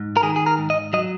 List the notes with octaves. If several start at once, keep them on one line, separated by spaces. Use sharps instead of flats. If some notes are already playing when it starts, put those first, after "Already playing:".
Already playing: G#2
A#4
D#3 G#4
G#4
A#4
G#2
D#5
F#3 D#5